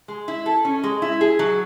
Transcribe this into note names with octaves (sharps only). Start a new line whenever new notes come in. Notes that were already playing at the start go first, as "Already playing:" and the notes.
G#3
E4
A4
C#4
G#3
E4
G#4
F#3